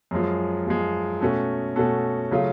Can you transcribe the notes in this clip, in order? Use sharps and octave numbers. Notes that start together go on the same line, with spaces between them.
F#2 F3 G#3
F#2 F3 G#3
B2 A3 C#4 F#4 A4
B2 A3 C#4 F#4 A4
C#3 F#3 A3 F4